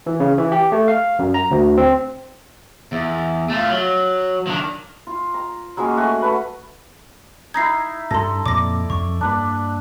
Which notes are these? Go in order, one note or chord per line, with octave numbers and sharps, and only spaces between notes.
E3
C#3
E3
G4
A3
F5
F#2
A#5
D2
C4
E2
A3 F4
F#3
D#3 D4
F4
A#5
F#3 G#3 A#3 C#4
A3 F#4 G#5
A3 B4 F#5
D#4 E4 G#6 A#6 C7
G2 G3 A4 C6 A#6
F2 A#2 D5 D6 A#6
F2 C#6
G2 A#3 D4 B4